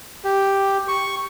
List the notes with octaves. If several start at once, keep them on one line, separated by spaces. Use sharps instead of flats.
G4
C#6